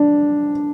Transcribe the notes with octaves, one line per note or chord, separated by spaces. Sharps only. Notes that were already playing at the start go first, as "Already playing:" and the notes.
Already playing: D4